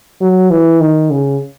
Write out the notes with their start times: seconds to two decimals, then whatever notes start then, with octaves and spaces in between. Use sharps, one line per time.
0.21 F#3
0.51 E3
0.81 D#3
1.11 C#3